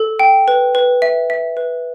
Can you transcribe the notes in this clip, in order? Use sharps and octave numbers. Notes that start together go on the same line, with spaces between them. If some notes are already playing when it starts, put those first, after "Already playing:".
Already playing: A4
G5
B4
B4
E5
E5
B4